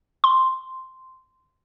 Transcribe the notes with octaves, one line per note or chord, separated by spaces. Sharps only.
C6